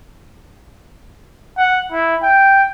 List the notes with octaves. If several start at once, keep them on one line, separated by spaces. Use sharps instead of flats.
F#5
E4
G5